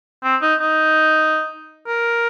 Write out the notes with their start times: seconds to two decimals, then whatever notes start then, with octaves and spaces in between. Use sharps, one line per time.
0.24 C4
0.42 D#4
0.60 D#4
1.88 A#4